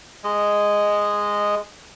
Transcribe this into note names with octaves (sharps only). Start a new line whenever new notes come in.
G#3 D#5